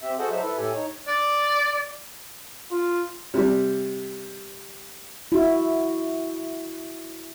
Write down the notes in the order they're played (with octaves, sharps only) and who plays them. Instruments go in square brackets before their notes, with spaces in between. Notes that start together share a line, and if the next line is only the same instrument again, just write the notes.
[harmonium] C4 G4 E5
F#4 G#4 A4 C5 D#5 F#5
F#3 D4 D#4 C5 E5
E4 A4 B4
A2 G4 A4 G#5
D#4 C#5
[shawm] D5
[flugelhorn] F4
[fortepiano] C3 G3
[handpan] E4 F#4